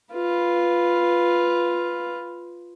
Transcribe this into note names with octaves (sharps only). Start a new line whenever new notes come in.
F4 B4